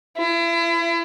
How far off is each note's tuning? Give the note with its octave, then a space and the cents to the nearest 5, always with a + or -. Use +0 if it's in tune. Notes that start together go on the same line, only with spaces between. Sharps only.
E4 +35